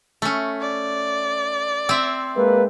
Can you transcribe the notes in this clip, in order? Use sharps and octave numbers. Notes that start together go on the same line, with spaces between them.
A3 C#4
D5
C4 E5
G#3 A#3 B4